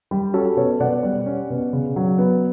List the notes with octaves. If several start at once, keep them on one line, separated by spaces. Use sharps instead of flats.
G3 G4
C#4 F#4 A4
B2 A4 C#5
B2 D5 F#5
G3
C#4
B2
C#3
F#3
B3